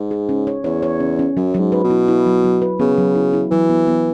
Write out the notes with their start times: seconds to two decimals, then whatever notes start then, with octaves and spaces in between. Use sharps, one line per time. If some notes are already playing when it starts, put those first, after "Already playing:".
Already playing: G#2
0.11 G#4
0.29 C#4
0.47 C#5
0.64 E2 C#5
0.83 C#5
1.00 C#4
1.19 C#4
1.36 F#2 F#3
1.54 F#3
1.60 G#2
1.72 B4
1.84 B2
1.90 E4
2.08 E4
2.26 F#3
2.44 F#3
2.62 B4
2.80 C#3 B3
2.98 F#3
3.15 E4
3.33 E4
3.51 E3 F#3
3.70 B3
3.88 B3